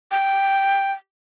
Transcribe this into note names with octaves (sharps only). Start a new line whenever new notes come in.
G5